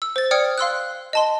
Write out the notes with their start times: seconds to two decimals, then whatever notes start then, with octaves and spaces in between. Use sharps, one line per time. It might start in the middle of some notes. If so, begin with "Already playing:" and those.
0.02 E6
0.16 C5 A6
0.31 D5 G5 D#6 F6 G#6 C#7
0.58 F5 C6 E6 F#6
1.13 D#5 A5 C6